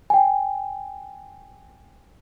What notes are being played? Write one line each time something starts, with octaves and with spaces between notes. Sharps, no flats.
G5 G#5